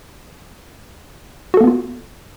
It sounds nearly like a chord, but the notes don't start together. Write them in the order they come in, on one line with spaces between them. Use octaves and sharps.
F#4 A4 A#3 B3 F4